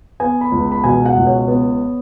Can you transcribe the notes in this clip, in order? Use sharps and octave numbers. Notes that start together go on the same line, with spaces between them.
B3 G#5
B5
C#2
B5
B2 G#5
F#5
C#2
C#5
B3